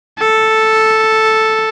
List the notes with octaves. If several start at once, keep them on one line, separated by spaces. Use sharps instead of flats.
A4